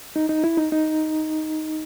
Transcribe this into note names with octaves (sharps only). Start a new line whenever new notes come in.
D#4
D#4
E4
D#4
D#4